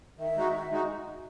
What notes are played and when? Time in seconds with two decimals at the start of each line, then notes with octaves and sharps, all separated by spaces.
0.18 D#3 E5
0.36 G#3 D#4 F#4
0.53 D#3
0.70 G#3 D#4 F#4